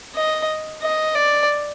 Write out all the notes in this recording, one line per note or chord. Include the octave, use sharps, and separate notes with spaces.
D#5
D#5
D5